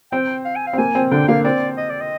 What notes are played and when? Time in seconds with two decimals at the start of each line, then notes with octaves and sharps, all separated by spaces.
0.12 C4 G5
0.45 F5
0.56 G#5
0.67 F5
0.73 C4
0.78 A#3 G#5
0.95 C4
1.11 D3 D4 G5
1.28 A#3 F5
1.45 C4 D5
1.77 D#5
1.90 D5
2.01 D#5